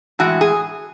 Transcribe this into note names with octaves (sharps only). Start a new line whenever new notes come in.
A2 E3 G#3 F#4
G#4